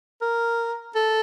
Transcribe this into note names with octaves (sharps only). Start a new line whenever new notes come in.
A#4
A4